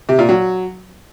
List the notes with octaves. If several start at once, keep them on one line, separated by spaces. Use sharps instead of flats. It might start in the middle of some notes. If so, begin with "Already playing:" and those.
C3
A#2
F#3